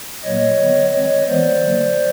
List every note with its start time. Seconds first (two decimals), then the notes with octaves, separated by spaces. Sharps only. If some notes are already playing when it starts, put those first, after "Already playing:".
0.23 A#2 F#3 A#3 C#5 D#5
0.59 D3 F#3 B3
0.92 D#3 G#3 C4 C#5 D#5
1.27 E3 G#3 B3 C5 D5
1.61 D3 F#3 A#3